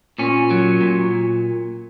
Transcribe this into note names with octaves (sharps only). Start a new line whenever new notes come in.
A#2 C#4
F#3
A#2